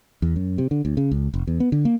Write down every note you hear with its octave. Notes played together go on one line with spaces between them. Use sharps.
E2
F#2
C3
D3
D2
C#3
C#2
F1
E2
B3
D3
A#3